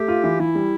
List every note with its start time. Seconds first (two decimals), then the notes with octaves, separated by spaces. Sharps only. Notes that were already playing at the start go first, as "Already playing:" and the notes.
Already playing: A3 G4
0.08 F4
0.24 E3
0.39 E3 E4
0.55 G3